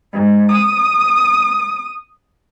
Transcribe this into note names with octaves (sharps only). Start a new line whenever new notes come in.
G#2
D#6